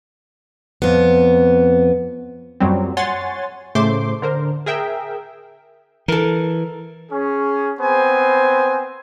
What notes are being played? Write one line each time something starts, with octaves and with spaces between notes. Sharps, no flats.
F2 B3
F#2 A#2 F#3 G3 C4
C#5 F#5 G#5 C6 A6
A2 C#3 A3 C5 C6 D6
D3 A#4 C5
G#4 A#4 E5 G5
E3 A4 A#4
C#4 G#4
B3 C4 C5 G#5